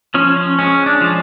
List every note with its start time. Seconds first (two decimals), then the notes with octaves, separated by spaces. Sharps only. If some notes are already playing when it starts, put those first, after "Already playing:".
0.14 F3 C#4
0.36 C#4
0.59 G#3 C#4
0.86 D4
1.01 F3